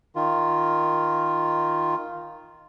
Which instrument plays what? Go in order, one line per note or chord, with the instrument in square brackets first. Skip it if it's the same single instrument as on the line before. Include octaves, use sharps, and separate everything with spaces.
[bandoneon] D#3 F4